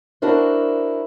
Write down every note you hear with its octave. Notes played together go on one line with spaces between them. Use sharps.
D4 E4 F#4 A#4 C5